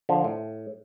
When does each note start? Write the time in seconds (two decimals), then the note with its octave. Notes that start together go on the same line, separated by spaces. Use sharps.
0.09 D3 F3
0.24 A2